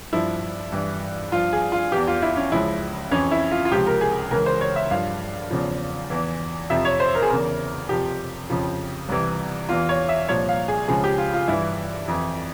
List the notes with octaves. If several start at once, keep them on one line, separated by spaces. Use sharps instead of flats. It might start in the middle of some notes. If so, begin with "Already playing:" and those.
G2 F3 E4
G2 E3
G2 F3 F4
G#4
F4
E2 E3 G4
F4
E4
C#4
C#2 C#3 F3 E4
F2 E3 C#4
E4
F4
F4
C#2 C3 F3 G4
A#4
G#4
C#2 C#3 E3 A#4
C5
C#5
E5
G2 F3 F5
E2 C#3 F3
E2 E3
F2 C3 F3 E5
C#5
C5
A#4
G#4
E2 C#3 E3 A#4
F2 C3 F3 G4
F2 C#3 F3
C2 C3 E3
E2 E3 F4
C#5
E5
C2 A#2 F3 C#5
F5
G#4
C#2 C#3 F3 G#4
G4
F4
F4
G2 E3 E4
F2 E3